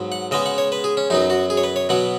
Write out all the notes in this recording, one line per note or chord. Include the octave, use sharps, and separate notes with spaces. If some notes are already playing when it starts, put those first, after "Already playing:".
Already playing: G#2 F#3 B3
F#5
C#3 G#3 B3 D#5
F#5
C#5
B4
G#4
C#4
F#2 F#3 B3 D#4
F#4
G#4
C#5
B4
C#5
B2 F#3 B3 F#5